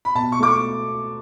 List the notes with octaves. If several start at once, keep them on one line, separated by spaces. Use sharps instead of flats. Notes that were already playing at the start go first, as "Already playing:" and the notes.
B5
B2 A5
C#6
A3 D6
C#6